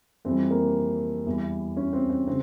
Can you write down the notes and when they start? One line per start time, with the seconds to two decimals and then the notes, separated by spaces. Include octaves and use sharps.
0.25 F2 E3 G3 C4
0.51 A#3
1.27 E2 E3 G3
1.77 C#4
1.93 C4
2.10 C4
2.27 C#3 C4